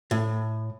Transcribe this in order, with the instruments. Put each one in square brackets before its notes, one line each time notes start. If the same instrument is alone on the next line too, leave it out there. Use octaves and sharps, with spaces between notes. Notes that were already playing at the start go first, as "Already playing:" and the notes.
[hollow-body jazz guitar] A2